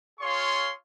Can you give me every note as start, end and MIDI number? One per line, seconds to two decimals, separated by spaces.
0.20 0.71 65
0.20 0.71 68
0.20 0.71 73
0.20 0.71 77
0.20 0.71 84
0.20 0.71 85